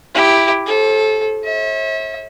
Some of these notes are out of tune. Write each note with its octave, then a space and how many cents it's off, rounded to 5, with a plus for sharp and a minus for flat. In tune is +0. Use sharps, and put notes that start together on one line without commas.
E4 +0 G4 +0
A4 -20 C5 +45
C#5 -45 E5 -35